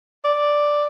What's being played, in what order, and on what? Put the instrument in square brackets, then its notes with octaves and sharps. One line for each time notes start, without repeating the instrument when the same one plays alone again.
[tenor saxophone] D5